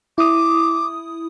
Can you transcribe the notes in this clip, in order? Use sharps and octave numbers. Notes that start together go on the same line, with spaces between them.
E4 D6 D#6